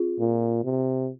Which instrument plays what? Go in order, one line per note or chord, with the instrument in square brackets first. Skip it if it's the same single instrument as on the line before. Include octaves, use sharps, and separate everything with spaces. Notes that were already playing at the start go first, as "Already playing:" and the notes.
Already playing: [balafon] C4 F4 G#4
[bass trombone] A#2
C3